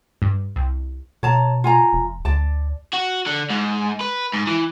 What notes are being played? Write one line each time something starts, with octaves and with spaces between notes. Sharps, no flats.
G2
C2
B2 C#5 A5 A#5
F4 G#5 A#5
F1
D2 D5 A5
F#4
D3
G#2
B4
G#2
E3